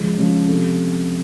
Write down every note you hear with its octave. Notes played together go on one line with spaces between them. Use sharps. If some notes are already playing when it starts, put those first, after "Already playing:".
Already playing: C#3 F3 G#3 C#4
C#3 F3 G#3 C#4
C3 F3 A3